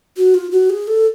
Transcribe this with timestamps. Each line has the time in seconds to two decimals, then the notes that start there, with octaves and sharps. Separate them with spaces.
0.17 F#4
0.34 F4
0.51 F#4
0.70 G#4
0.87 A4